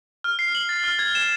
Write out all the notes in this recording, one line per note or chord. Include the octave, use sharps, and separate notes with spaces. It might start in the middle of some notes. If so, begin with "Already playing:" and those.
F6
C7
F#7
A6
F6
G#6
E7